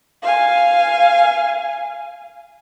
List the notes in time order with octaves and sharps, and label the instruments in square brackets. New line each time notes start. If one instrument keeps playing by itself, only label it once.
[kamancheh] F5 G#5